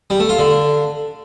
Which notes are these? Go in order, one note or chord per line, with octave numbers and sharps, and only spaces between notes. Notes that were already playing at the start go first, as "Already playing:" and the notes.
G3
A3
F4
D3